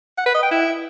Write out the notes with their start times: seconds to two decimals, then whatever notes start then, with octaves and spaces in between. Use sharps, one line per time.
0.18 F#5
0.26 B4
0.34 D#5
0.43 G5
0.51 E4